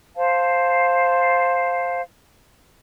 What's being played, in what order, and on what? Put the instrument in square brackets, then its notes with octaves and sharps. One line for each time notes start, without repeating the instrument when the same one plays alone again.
[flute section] C5 F5 A5